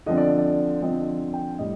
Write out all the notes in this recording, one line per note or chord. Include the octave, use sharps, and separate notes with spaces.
D3 F3 C4 D#5
D5
D5
D3 F3 C4 D#5
G5
A2 G3 D#5